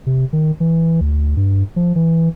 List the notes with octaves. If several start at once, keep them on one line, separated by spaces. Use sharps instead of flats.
C3
D#3
E3
D2
G2
F3
E3